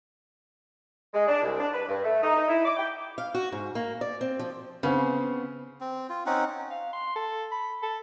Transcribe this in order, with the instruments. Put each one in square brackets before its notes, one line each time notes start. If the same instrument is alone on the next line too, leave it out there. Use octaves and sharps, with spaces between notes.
[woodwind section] G#3
D4
C2
D4
B4
G2
A3
D#4
D#4
E4
D6
G5
[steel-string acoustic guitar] F5
F#4
G#2
A#3
D5
C4
F3
[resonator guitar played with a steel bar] C#3 [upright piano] B3 C4
[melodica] C4
F4
C4 C#4 D#4 F#5
[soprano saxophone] F5
C6
A4
B5
A4